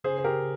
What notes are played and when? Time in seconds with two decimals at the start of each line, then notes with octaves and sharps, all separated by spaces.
0.04 C#3 G#4 C5
0.18 C5
0.24 G4 A#4